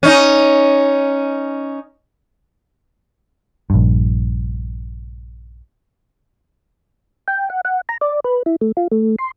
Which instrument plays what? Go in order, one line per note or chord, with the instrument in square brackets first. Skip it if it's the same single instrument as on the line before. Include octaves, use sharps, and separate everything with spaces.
[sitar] C#4 D#4
[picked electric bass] A#1 G2
[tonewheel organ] G5
F#5
F#5
A#5
D5
B4
E4
A3
F4
A3
C6